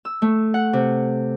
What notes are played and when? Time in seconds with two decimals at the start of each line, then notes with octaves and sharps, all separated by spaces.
0.05 E6
0.22 A3
0.54 F#5
0.73 C3